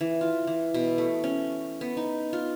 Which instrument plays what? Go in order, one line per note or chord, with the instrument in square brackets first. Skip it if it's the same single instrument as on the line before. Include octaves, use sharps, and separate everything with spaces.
[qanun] E3
F4
E3
B2
A3
C#4
B3
D#4
F4